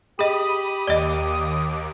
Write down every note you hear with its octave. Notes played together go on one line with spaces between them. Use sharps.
G4 G#4 D#5 B5 D#6
D#2 D5 D#5 D6